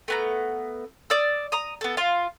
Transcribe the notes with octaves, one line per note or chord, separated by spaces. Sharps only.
A3 B3 A#5
D5 D#6 E6
A#5 D#6
B3 A4
F4 F5